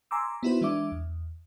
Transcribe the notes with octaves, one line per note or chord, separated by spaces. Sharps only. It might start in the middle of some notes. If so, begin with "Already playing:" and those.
G#5 A#5 C6 D6 E6
B3 D#4 E4 F#4 B4 C5
E3 G#3 D4 E5 D6
E2